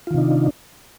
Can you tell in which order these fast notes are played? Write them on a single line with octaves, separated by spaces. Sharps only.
F4 D#3 C3 D#4 D4